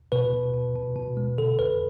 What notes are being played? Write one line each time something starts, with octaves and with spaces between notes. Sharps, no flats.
B2 B4
B2
B2
B2
B2
G#3
D3 A4
F2 B4